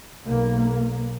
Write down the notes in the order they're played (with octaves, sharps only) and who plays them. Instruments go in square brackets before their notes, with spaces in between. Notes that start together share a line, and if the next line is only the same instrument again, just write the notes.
[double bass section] B1 A#3